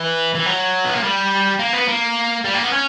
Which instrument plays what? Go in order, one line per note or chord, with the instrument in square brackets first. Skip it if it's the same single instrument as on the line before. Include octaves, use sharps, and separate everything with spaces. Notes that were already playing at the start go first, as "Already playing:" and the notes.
Already playing: [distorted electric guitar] E3
E3
F#3
B3
A#3
G3
A#3
B3
A#3
G3
A#3
B3
C#4